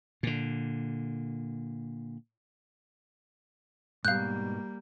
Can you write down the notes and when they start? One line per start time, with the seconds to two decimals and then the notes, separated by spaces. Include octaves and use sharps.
0.23 A#2 D3
4.05 G#2 B2 G3 A#3 F5 F#6 G6